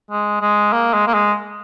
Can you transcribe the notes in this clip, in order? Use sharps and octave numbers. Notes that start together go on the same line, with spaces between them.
G#3
G#3
A#3
G#3
A#3
G#3